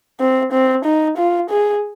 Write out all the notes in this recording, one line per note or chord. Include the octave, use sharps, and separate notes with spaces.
C4
C4
D#4
F4
G#4